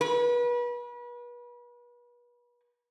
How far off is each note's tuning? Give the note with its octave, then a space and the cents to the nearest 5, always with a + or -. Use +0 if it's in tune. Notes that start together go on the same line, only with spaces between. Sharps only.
B4 -35